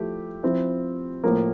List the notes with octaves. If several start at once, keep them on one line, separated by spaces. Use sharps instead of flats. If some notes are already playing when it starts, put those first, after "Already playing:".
Already playing: F3 A3 E4 G4
F3 C4 E4
A2 F3 A#3